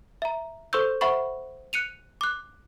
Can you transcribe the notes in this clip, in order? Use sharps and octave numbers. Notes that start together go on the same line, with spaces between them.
E5 A#5
A4 C5 C6 C#6 E6 G6
C5 E5 F#5 B5 C#6
F#6 C#7 D#7 F7
D6 F#6